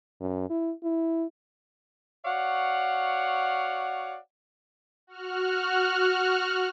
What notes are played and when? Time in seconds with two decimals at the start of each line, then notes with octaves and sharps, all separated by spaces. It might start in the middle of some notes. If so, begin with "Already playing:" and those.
0.21 F#2
0.50 E4
0.84 E4
2.25 F#4 C#5 D5 F5 F#5
5.07 F#4 F6 F#6